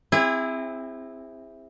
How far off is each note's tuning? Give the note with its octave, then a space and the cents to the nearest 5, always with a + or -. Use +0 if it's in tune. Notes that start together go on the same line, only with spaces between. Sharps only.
C4 +0 E4 +0 G#4 -35